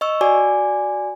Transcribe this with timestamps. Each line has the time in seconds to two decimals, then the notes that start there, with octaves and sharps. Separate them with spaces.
0.01 D#5 C#6 E6
0.21 F#4 D5 G#5 D6